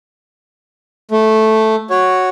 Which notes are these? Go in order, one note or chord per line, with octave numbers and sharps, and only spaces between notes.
A3
F#4 C#5